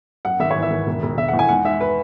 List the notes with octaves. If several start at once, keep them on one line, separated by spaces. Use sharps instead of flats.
F#2 F#5
G#1 E5
C#5
E3
E5
G#1
E1
E1
E1 E5
F#5
E2
G#5
G#2 F#5
G#2 E5
B4